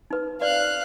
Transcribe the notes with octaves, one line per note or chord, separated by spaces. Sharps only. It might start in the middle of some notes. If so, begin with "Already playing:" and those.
D#4 B4
B4 D5 F5 F#6